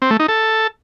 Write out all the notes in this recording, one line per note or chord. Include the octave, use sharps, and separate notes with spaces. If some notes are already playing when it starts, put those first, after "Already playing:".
C4
A3
D#4
A4